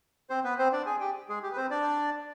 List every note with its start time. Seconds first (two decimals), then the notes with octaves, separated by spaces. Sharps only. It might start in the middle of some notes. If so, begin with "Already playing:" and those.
0.30 C4 C5
0.44 B3 B4
0.58 C4 C5
0.72 D4 D5
0.86 G#4 G#5
1.00 G4 G5
1.29 G#3 G#4
1.43 G4
1.51 B4
1.56 C4 C5
1.70 D4 D5